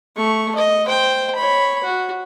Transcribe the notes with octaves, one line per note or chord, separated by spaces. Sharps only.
A3 C#6
D#5
C5 G5
C#5 B5
F#4